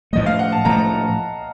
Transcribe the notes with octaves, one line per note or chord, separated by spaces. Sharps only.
A2 F3 A3 D#5
F5
F#5
A5
A2 F3 A3 A#5